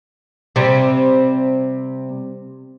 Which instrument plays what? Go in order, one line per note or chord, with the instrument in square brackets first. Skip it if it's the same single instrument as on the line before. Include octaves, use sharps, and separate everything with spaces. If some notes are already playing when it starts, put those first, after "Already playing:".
[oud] C3 G3